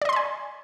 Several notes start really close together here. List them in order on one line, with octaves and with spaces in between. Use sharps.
D5 D#5 C6 B5 G#5